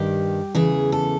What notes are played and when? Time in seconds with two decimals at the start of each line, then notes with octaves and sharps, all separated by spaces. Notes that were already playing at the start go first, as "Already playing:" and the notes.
Already playing: G2 D#3 G4
0.55 E2 C#3 E3 G#4
0.92 A4